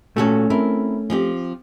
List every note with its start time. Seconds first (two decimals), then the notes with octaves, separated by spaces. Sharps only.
0.16 A#2 A3 C#4 F#4 A4
0.50 C4 E4 A#4
1.10 F3 C4 G4